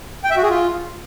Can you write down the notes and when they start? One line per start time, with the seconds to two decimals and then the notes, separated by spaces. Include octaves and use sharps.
0.24 G5
0.31 E5
0.37 F#4
0.43 G#4
0.50 F4